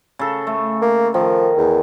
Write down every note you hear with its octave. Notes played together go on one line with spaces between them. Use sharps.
C#3 A4
A3
A#3
D#3 F3
E2